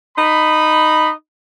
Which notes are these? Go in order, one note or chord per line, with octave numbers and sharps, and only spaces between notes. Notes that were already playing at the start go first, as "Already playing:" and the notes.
D#4 D#5 B5